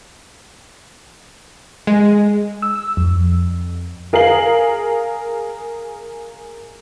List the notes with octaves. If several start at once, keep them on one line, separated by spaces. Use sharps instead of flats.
G#3
E6
F2
G#4 A#4 F5 C7 F#7